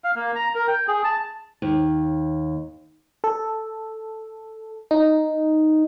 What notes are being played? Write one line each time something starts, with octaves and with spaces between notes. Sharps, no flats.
F5
A#3
A#5
A#4
G5
G#4
A5
D#2
A4
D#4